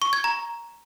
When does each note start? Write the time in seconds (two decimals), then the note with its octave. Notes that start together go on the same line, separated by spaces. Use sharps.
0.02 C#6
0.13 G#6
0.24 A#5